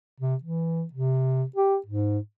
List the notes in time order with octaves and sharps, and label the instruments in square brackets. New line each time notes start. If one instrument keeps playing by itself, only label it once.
[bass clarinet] C3
E3
C3
G4
G#2